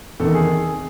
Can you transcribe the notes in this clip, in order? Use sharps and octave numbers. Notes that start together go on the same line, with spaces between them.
E2 C3 D#3 A4
G#4